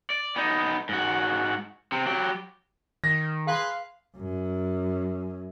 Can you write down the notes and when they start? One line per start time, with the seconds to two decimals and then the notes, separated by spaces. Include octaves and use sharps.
0.10 D5
0.36 B3 D#4
0.89 G#2 F#4
1.92 C3 C4
2.06 F#3 G4
3.04 D#3 A#6
3.47 G#4 B4 F5 C6
4.17 F#2